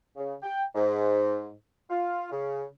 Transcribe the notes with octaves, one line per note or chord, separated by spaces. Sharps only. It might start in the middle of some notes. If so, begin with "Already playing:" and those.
C#3
G5
G#2
F4
C#3